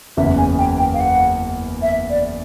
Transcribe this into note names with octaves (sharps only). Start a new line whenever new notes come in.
F#1 E2 C#3 E5
G#5
G5
G5
F5
F#5
E5
D5